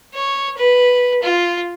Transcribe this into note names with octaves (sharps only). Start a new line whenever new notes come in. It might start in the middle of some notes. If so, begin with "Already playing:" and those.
C#5
B4
F4